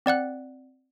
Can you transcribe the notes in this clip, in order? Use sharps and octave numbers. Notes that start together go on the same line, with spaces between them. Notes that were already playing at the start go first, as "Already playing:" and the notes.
C4 D5 F#5 F#6